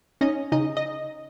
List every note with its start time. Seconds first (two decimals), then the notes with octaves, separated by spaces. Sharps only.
0.21 C#4 D#4 D#5
0.52 C#3 D#4 D#5
0.77 D#5